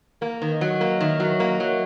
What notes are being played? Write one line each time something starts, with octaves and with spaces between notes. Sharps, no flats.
A#3 A#4
D#3 B4
D#5
F#3 C#5
A#3 D#5
D#3 E5
F#3
D#5
A#3
C#5
F#3